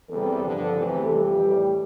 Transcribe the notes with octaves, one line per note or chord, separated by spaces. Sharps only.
E2 C3 G3 A4
G2 D3 F3
E2 C3 E3 A3
F2 E3 G3 G4
A2 E3 G3